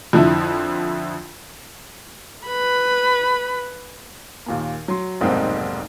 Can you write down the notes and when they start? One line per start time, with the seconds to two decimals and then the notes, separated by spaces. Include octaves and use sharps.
0.13 F2 D3 F3 E4
2.48 B4 B5
4.46 D#2 A#2 A#3
4.88 F#3 C6
5.21 F1 B1 G#2 A#3 C4 D#4